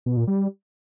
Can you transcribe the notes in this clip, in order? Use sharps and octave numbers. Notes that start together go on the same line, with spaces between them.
B2
A#2
G3